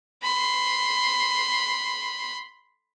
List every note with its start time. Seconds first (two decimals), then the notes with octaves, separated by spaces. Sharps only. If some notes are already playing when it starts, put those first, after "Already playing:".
0.23 B5 C6